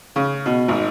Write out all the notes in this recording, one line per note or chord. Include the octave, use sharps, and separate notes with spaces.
C#3
B2
G#1